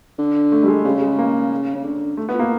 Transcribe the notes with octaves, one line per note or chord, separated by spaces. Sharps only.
D3
A3
G3
G#3
C#3 G3
G#3
A#3
C#3
D3
A3
B3
A#2
A#3